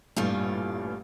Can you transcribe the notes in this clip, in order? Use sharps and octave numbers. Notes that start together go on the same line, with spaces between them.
A1 G2 A#2 G3 A3 F4